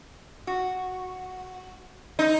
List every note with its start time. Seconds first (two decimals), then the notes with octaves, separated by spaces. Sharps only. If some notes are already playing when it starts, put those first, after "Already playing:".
0.47 F#4
2.19 D#4